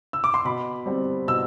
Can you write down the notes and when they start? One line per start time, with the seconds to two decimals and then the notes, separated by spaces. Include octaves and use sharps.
0.13 E6
0.24 D6
0.34 C6
0.45 B2 B5
0.86 G3 C4
1.27 B2 E6